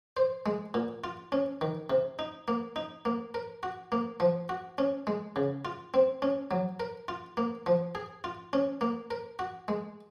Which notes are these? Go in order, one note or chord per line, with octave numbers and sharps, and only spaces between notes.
C5
G#3
A#2
F4
C#4
D#3
C3
D#4
A#3
D#4
A#3
A#4
F#4
A#3
F3
F#4
C#4
G#3
C#3
F4
C4
C#4
F#3
A#4
F4
A#3
F3
G#4
F4
C#4
A#3
A#4
F#4
G#3